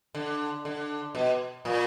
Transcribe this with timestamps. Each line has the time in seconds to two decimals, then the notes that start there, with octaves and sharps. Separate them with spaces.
0.15 D3
0.65 D3
1.15 B2
1.65 A#2